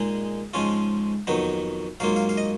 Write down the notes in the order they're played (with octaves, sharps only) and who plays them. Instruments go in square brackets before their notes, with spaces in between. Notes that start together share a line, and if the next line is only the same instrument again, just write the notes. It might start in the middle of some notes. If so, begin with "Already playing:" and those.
Already playing: [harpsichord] A#2 G#3 D#4 G#4
G#2 F3 G#3 C#4 F4
F2 D#3 F#3 B3 D#4
G#2 F#3 A#3 F4 F5
F5
F5
D#5